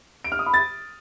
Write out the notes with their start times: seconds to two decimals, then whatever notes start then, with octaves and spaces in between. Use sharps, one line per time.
0.24 D7
0.32 F6
0.39 D#6
0.46 B5
0.54 A6